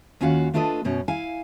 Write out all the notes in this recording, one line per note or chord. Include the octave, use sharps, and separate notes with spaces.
D#2 C#4 F4 F#4 F5 F#5
A3 D4 F4 A4 B4 D#5
F#2 B2 C#4
E4 F5 G#5